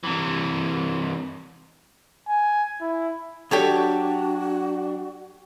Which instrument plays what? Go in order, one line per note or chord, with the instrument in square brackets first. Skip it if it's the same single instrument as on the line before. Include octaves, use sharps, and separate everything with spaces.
[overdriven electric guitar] C3 E3
[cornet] G#5
E4
[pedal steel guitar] F#3 D4 [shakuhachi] F#4 [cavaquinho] G4 A4 C#5